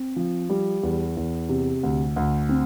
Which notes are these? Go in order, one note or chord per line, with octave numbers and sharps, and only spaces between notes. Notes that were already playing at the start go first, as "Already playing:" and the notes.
Already playing: C4
F3
G3
E2
E2
C3
D2
D2
C4